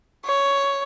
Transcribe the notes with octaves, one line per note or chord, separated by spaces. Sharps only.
C#5